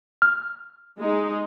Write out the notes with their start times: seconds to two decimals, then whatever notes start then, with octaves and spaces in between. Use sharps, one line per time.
0.22 F6
0.98 G#3 D#4